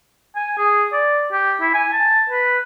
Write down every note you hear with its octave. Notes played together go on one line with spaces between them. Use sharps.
G#5
G#4
D5
G4
E4
G#5
A5
B4